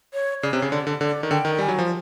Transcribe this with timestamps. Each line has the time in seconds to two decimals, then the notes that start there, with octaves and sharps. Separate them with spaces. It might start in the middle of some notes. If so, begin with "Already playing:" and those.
0.14 C#5
0.42 C#3 D5
0.53 C3
0.58 C#3 C#5
0.72 D3 D5
0.87 D3
1.01 D3 D5
1.23 D#3
1.31 D3 G5
1.45 D#3
1.59 G3 G#5
1.68 F#3
1.79 F3